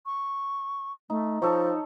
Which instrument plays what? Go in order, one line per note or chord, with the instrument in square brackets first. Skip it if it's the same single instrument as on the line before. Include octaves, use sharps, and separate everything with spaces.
[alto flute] C#6
[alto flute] A3 [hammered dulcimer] D#4
[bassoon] F3 [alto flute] D#4 [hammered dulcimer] A4 C#5